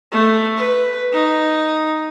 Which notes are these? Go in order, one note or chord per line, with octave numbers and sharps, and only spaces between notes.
A3
B4
D#4